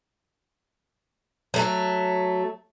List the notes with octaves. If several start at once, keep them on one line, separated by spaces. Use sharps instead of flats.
F#3 A3